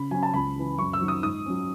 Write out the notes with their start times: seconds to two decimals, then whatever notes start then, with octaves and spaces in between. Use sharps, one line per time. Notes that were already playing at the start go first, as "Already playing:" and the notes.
Already playing: C#3 B5
0.11 F#3 C#4 G#5
0.23 A5
0.34 C#2 B5
0.56 C#3 E3
0.78 F#2 C#6
0.93 E6
1.01 D#3 F#3
1.08 D#6
1.23 G#2 D#6
1.46 F#3 C#4